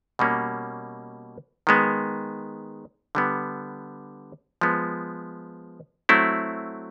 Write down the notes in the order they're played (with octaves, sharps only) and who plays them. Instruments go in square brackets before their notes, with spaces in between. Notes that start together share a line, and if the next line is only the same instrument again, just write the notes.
[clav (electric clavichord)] B2 G3 A#3 C#4
D#3 G#3 B3
D3 G3 B3
F3 G#3 B3
F#3 A3 C4 E4